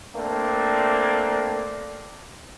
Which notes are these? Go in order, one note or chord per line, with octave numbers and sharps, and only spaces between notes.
A3 A#3 C4 D4